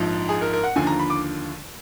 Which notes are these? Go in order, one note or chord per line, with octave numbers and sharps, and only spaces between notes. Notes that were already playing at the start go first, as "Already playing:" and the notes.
Already playing: A#1 G#2 F3
G#4
A#4
A#4
F#5
D#2 D3 F3 G#5
A#5
B5
D6